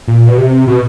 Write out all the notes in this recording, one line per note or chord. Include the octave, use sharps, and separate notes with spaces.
A#2
B2
C3
B2